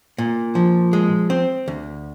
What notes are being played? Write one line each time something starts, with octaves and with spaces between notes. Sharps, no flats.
A#2
F3
G#3
C4
D2